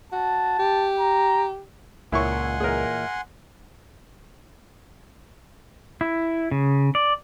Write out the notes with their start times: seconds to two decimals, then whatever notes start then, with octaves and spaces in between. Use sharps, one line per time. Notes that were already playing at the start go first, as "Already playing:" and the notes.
0.12 F#4 A5
0.59 G4
0.99 A#5
2.12 C#2 A#2 E4 C#5 F#5 G#5 C6 C#6
2.60 A#2 E3 G#4 A#4
6.01 E4
6.51 C#3
6.95 D5